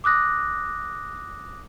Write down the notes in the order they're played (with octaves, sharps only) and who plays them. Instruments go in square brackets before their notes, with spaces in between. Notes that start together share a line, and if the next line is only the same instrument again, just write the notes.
[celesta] D6 D#6 F#6 A#6